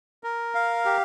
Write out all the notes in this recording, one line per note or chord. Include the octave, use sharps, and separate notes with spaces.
A#4
F5
G4